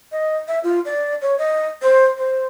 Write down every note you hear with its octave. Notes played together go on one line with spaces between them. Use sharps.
D#5
E5
F4
D5
C#5
D#5
C5
C5